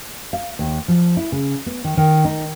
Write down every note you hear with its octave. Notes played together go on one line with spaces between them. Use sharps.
F5
D#2
F3
E4
C#3
B3
D#3
D#3
D#4